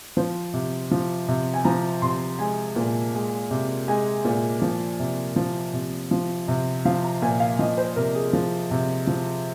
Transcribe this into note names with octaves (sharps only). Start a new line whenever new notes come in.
F3 C5
C3
F3
C3
G#5
F3 A#5
C3 C6
G#3 G#5
A#2
G#3
C3
G#3 G#5
A#2
F3
C3
F3
C3
F3
C3
F3 F5
A#5
A#2 G#5
F5
F3 D#5
C5
C3 A#4
G#4
F3
C3
F3